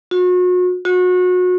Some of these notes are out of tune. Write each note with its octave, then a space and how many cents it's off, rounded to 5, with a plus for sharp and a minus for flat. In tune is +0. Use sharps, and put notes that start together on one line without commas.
F#4 -40
F#4 -30